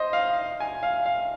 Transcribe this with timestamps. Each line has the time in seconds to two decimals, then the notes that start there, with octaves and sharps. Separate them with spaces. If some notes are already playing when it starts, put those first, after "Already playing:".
Already playing: C5 D#5
0.13 F5
0.60 G#5
0.83 F5
1.06 F5